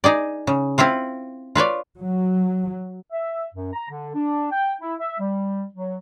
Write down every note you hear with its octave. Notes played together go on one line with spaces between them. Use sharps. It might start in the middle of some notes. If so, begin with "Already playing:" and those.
D#4 G#4 D5
C#3
C4 E4 F4 C5
F4 B4 C#5 D5
F#3
E5
F#2
A#5
D3
D4
G5
E4
E5
G3
F#3